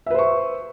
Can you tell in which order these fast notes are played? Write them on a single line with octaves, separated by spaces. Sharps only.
E5 B4 C5 C#6